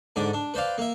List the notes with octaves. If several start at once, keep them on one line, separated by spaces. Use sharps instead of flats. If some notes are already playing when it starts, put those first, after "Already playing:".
G#2 D3 D5
D4
B4 C5 D5 F5
A#3 E5